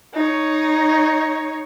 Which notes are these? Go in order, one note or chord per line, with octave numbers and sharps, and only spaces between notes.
D#4 C#5